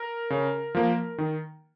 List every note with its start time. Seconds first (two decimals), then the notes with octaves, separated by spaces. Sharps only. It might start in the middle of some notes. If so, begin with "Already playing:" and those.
Already playing: A#4
0.30 C#3
0.75 F3 A#3
1.18 D#3